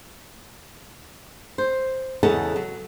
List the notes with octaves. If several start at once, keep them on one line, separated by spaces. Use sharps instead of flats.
C5
E2 C#3 A4 D#5 F#5 A5
F#3